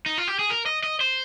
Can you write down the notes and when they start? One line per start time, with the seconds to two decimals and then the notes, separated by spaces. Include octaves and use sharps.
0.06 D#4
0.18 F4
0.28 G4
0.39 G#4
0.50 A#4
0.66 D#5
0.84 D#5
1.01 C5